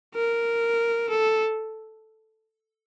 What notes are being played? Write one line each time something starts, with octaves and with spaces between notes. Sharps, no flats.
A#4
A4